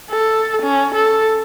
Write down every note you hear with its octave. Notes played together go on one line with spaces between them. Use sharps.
A4
C#4
A4